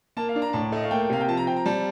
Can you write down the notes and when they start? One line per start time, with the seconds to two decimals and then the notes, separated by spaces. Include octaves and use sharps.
0.17 A#3 A5
0.29 F5
0.36 D4
0.42 A#5
0.53 A2 A5
0.72 A3 D#5
0.83 F5
0.91 A#3 G5
1.09 C3 F5
1.21 G5
1.28 F3 A5
1.37 A#5
1.47 C4 G5
1.56 A#5
1.65 G3 A5